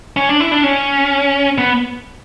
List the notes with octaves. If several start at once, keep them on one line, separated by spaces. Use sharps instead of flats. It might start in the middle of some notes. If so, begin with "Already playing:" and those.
C#4
D4
E4
D4
C#4
B3